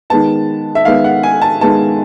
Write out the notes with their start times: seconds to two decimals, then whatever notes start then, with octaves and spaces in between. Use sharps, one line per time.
0.10 D#3 G#3 B3 A5
0.75 E5
0.85 D#3 G#3 B3 F5
1.04 F#5
1.23 G#5
1.42 A5
1.61 D#3 G#3 B3 A5